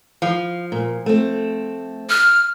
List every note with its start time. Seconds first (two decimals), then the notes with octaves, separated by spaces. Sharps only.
0.22 F3 F5
0.72 A#2
1.06 A3 C4
2.10 F6